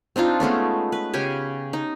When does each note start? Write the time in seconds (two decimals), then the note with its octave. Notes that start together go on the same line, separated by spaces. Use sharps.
0.16 C4 D4 D#4 F4
0.40 G#3 A3 B3 C#4
0.92 B4
1.13 C#3 C#4 G4 G#5
1.73 D#4